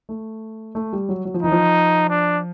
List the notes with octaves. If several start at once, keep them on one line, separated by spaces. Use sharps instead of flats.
A3
A3
G3
F#3
F#3
F3
E3 D#4
F3
D4